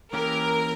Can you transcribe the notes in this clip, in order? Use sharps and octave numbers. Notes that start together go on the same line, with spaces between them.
E3 A#3 C#4 G4 A#4